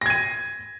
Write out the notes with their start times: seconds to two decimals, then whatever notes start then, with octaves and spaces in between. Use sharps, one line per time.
0.01 A#6
0.06 G#6
0.10 D#7